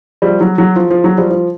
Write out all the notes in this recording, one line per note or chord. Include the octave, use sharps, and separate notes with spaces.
F3 G3
F#3
F#3
F3
F3
F#3
F3 G3
F3